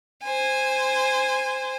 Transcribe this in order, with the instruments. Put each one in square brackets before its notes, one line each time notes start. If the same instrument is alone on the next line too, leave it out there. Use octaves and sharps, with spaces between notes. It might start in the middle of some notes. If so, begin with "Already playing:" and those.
[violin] C5 G#5